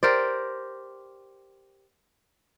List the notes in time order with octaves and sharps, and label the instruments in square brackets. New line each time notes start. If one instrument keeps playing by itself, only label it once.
[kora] G4 A#4 C5 D5